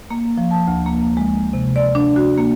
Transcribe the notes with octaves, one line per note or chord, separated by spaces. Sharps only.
A#3
F3
A5
D2
A#3
G#3
C3
D5
D4
F#4
A#3